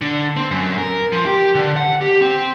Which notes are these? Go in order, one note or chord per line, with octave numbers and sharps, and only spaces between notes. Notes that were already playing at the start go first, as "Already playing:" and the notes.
D3
C4
F#2
A#4
F3
G4
D3
F#5
G4
C4